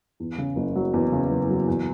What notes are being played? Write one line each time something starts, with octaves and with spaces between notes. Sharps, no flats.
E2
C#3
F#1
F#3
E2
C#3
F#1
F#3
E2